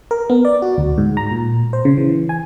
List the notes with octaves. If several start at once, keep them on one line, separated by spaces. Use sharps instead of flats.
A#4
B3
D5
F#4
D2
G#2
A#5
A#2
C5
C#3
E3
G#5